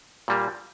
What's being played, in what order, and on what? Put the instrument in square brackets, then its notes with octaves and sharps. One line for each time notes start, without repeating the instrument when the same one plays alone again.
[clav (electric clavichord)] A#2 G3 A#3